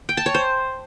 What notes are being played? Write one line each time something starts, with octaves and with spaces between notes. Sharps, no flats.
G5
A5
C#5
C5